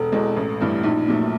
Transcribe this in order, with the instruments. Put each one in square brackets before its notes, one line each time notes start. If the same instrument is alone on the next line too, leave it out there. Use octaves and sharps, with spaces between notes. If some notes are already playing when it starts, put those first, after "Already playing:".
Already playing: [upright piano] E1 [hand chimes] A4
[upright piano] E2 B2 G#3
A1
G2 E3 A3
[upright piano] A#1 [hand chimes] D#4
[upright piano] A#2 F#3 A3